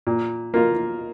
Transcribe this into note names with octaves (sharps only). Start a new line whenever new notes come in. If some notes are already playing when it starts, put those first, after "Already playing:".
A#2
A#3 F4